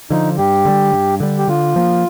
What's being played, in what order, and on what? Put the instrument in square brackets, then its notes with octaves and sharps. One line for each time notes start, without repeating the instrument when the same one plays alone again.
[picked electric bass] D3 F3 [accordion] D#4
[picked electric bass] G2 [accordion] G4
[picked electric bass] D3 G3
G2
D3 G3
[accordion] G4
[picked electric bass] D3 [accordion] F4
[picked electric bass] F3 A#3